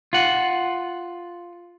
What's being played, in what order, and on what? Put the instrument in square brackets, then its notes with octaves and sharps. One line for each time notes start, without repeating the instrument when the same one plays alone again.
[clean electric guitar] F4 F#5